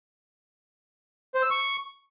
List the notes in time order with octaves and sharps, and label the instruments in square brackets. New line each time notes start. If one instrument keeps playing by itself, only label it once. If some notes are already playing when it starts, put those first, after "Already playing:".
[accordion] C5
E6
C#6